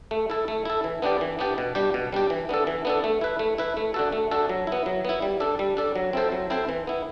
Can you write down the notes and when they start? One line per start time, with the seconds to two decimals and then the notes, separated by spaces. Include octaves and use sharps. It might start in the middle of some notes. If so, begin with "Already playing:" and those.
0.11 A3
0.30 E4 A4
0.48 A3
0.65 E4 A4
0.84 E3
1.02 B3 D4 G4 D5
1.21 E3
1.39 B3 D4 G4 D5
1.58 B2
1.75 G3 D4 G4
1.94 B2
2.13 G3 D4 G4
2.30 E3
2.49 B3 D4 A4
2.67 E3
2.85 B3 D4 A4
3.04 A3
3.21 E4 B4
3.39 A3
3.58 E4 B4
3.77 A3
3.94 D4 F#4 A4
4.12 A3
4.31 D4 F#4 A4
4.49 F#3
4.67 B3 E4
4.86 F#3
5.05 B3 E4
5.22 G3
5.40 D4 A4 D5
5.59 G3
5.77 D4 A4 D5
5.95 F#3
6.13 C4 E4 A4 C5
6.32 F#3
6.50 C4 E4 A4 C5
6.69 E3
6.87 B3 E4